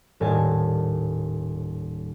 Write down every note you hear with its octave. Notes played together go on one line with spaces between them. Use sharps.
D#1 A2 G#5 A5